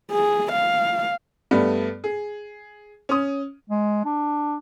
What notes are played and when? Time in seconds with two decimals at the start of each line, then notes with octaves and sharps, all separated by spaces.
0.11 G#4
0.52 F5
1.51 G2 G3 A3 B3
2.04 G#4
3.09 C#4 D#6
3.70 G#3
4.05 D4